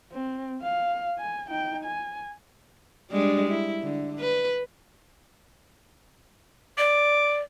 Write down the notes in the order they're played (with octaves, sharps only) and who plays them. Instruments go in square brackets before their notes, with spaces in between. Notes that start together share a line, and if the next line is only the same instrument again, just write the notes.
[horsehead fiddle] C4
F5
G#5
D#4 G5
G#5
[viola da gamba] G3 G#3 D4
E4
D3
B4
[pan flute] D5 [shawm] D6